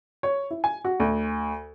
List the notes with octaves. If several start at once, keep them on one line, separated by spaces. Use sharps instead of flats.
C#5
E4
G#5
F#4
D2